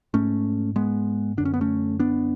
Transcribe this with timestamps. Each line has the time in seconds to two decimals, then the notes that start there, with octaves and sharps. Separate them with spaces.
0.14 G#2 A3 C#4
0.76 G#3 B3
1.37 F#2 D3 D4
1.45 C#4
1.54 B3
1.61 A3 C#4
2.00 B3 D4